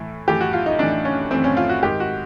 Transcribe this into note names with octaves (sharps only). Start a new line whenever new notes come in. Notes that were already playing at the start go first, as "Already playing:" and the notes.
Already playing: A2 E3
A2 E3 G4
F#4
F4
D#4
A2 E3 D4
C#4
A2 E3 C4
C#4
F4
F#4
G#2 D#3 G4
F#4